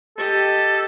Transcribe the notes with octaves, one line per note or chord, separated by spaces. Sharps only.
G4 A4 D#5